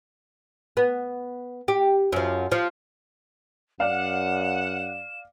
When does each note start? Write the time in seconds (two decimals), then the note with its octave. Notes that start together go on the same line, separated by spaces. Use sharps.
0.77 B3
1.68 G4
2.12 F#2 F3
2.52 F3
3.80 F#2 D5 F5 F#5 E7